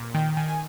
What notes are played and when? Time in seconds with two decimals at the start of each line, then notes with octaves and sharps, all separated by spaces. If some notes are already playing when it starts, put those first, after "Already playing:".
Already playing: A#2
0.14 D#3 G5
0.37 D#3 G#5
0.48 G#5